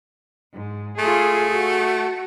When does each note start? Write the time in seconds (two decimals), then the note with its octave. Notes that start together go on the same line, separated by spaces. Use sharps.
0.54 G#2
0.98 A3 F4 G#4
1.50 F#4